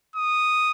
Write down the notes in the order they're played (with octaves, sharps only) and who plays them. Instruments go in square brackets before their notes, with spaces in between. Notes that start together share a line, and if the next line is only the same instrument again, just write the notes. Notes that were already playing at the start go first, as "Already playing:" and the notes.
[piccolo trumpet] D#6